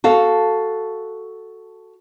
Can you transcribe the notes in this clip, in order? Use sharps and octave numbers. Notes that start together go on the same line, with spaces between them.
F#4 A4 F5